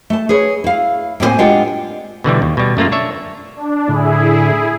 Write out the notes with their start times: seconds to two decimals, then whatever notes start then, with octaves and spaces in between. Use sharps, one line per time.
0.10 A3 A5
0.29 G#4 B4 C#5
0.64 E4 F5
1.20 A2 A#3 C4 D#4 C5 G#5
1.38 G#3 D4 F4 G4 F#5 G5
2.24 B2 D3 E3 G3
2.42 D#2
2.57 B2 G3
2.77 F#2 A3 A#3 F4
2.92 D4 C#5 E5
3.56 D4
3.88 A2 D3 E4 G#4